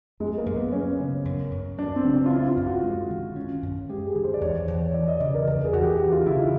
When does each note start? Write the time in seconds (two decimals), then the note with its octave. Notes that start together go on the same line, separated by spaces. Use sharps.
0.20 F#2 G#3
0.38 A#3
0.46 F#2
0.56 B3
0.72 F#3 C#4
1.00 C#3
1.25 F#2
1.51 F#2
1.78 F#3 D4
1.96 C4
2.04 C#3
2.14 D4
2.26 F4
2.30 C#4 E4
2.48 F4
2.57 F#2
2.67 F#4
2.83 G#3
3.10 D#3
3.36 C#4
3.62 F#2
3.89 G#3 G4
4.06 G#4
4.15 D#3
4.24 C5
4.34 D5
4.41 E2 C#5
4.68 E2
4.94 E3 D5
5.08 D#5
5.20 C#3 D5
5.34 A#4
5.47 E2 A#4
5.65 G#4
5.73 E2 F#4
5.82 G4
6.00 E3 F#4
6.12 F4
6.26 C#3 E4
6.39 D#4